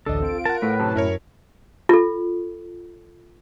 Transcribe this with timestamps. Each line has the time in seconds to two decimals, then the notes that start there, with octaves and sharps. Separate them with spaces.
0.06 A1 D2 D3 D4 A4 D#5
0.22 C4 F4 D7
0.45 A#4 F#5 A5
0.62 A2 B4
0.79 F#2 C3 A5
0.95 F#2 E4 A#4 C#5
1.89 F4 A4